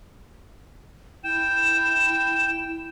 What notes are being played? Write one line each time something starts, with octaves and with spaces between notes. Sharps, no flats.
E4 G5 E7